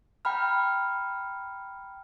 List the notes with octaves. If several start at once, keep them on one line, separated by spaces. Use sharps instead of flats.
G5 A#5 B5 F6